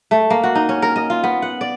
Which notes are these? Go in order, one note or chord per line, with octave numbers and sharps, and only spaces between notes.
A3
A#3
F#4
D#4
C#4
A#4
D#5
F4
B3
F#5
D5